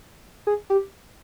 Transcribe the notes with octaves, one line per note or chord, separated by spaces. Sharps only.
G#4
G4